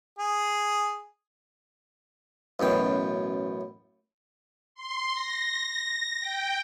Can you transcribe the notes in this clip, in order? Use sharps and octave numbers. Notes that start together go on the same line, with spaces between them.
G#4
A1 F#2 B2 G5
C6
A#6
G5